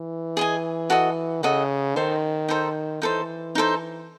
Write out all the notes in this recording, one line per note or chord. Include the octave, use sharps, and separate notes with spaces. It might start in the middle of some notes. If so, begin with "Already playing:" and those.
Already playing: E3
G#4 D#5 G#5
F#4 A4 D#5
C#3 F#4 A4 D#5
D#3 D#4 A4 C5
D#4 A4 C5
E3 D#4 A4 C5
D#4 A4 C5